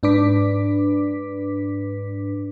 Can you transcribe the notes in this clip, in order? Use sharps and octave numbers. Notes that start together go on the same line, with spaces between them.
G#2 D4 B4 D6 B6